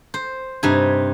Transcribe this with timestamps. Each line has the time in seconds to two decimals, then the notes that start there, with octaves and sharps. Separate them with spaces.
0.14 C5
0.63 G2 C3 D#4 G#5